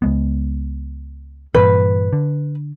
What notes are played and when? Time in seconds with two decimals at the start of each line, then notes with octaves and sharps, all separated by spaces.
0.02 C#2 G#3 B3
1.54 G2 A#2 E3 B4
2.13 D3